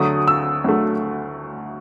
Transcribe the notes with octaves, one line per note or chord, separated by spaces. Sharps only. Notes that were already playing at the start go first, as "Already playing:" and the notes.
Already playing: D2 D3 F#3 A3 D#6
E6
D2 D3 F#3 A3